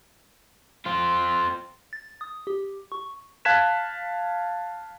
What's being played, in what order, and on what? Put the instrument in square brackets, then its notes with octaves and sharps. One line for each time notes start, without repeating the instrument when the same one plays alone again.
[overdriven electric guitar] C4 F4
[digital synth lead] A6
D#6
G4
C#6
[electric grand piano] F5 A5 F#6 G#6 B6 E7